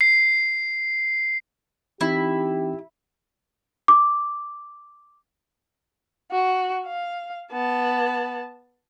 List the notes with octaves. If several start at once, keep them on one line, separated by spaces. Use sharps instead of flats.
C7
E3 C4 D#4 E4 G4
D6
F#4
F5
B3 A5